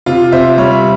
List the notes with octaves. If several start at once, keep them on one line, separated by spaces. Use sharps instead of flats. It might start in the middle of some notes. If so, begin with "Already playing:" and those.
C3 F4
C3 C5 E5
G3 C#5
E5